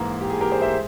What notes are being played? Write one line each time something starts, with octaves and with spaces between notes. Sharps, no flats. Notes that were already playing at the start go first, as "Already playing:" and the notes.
Already playing: G#2 E3 A#3
G4
G#4
G4 A#4
G#4 C5
C5 E5
G#3